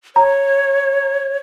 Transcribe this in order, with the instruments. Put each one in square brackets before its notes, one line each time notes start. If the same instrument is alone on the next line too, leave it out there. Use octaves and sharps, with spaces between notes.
[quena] C#5 [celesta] A#5